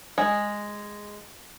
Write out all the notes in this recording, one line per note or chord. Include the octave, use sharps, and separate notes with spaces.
G#3